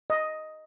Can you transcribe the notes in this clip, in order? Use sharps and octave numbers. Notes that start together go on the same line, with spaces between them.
D#5